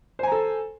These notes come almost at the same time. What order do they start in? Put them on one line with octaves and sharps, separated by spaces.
C5 G#5 A#5 A4